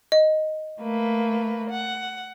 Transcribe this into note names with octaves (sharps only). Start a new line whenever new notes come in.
D#5
A3 A#3 B4
F#5